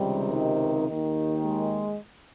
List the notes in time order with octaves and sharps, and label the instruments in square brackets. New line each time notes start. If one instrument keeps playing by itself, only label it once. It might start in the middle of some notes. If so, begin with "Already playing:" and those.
Already playing: [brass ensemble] C#2 C3 D#3 G3
D#4
D#2 D#3
G#3